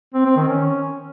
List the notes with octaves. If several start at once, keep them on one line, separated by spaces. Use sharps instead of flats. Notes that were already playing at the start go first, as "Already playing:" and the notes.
C4
C4
D#3
C#4